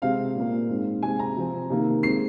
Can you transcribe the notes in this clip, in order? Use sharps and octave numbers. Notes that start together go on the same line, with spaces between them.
C3 G#3 C4 F5
A#2 A#3
G#2 G#3 C4
C3 G#3 C4 G#5
A#5
C3 F3 C4
C3 D#3 A#3
G#3 C4 C7